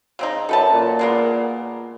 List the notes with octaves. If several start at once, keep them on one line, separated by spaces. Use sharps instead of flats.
C#3 C4 D#4
F#2 A4 B4 A5
A#2
G#3 A#3 B3